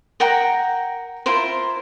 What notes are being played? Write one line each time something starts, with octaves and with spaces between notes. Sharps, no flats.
A#4 F#5 G5 A#5
E4 F4 A#4 C5